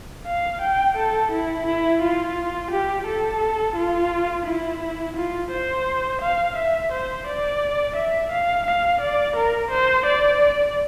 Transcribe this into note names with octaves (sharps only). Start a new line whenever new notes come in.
F5
G5
A4
E4
E4
F4
G4
A4
F4
E4
F4
C5
F5
E5
C5
D5
E5
F5
F5
D5
A#4
C5
D5